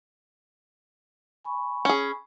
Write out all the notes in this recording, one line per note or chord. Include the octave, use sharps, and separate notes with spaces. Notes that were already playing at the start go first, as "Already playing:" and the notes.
G#5 B5 C#6
C#4 G#4